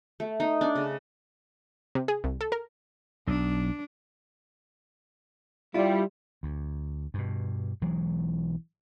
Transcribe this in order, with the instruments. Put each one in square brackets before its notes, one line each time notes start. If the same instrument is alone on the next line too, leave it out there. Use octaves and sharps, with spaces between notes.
[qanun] A3
D#4
D4
C#3
[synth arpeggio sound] C3
G#4
C2
A4
A#4
[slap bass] B1 [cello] D4
[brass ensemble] G3 [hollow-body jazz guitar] E4 F4
[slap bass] D2
G2 B2
B1 E3 F#3 G#3